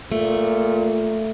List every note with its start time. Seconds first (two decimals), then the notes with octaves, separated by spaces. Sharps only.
0.12 A#2 A3